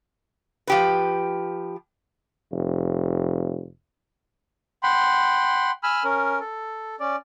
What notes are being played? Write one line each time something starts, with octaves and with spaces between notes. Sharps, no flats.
F3 G4 B4
F1
F#5 G5 B5 C6
G#5 B5 E6 F6
C#4 A#4
A4
C#4 D5